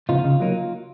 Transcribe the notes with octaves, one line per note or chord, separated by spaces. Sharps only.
C#3 F3 B3 D#4 F4
C#3
F#3 A#3 D#4